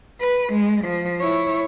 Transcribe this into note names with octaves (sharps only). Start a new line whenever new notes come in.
B4
G#3
F3
E4 C#5